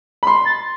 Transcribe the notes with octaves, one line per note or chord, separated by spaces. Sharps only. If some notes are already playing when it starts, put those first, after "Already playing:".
B5
C6
A6